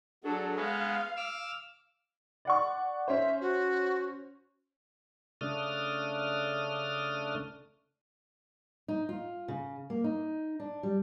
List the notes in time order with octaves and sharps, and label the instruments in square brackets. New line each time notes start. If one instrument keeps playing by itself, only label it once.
[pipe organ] F#3 [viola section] D4 G#4 A4
[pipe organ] G#3 B3 [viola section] F5
[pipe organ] D6 E6 F6
[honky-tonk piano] D5 F#5 C#6
[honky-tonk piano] C#4 C5 [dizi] E5
[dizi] F#4
[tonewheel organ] C#3 A3 D4 D#6 F6
[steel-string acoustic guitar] D#4
F4
C#3
A#3
D#4
D4
G3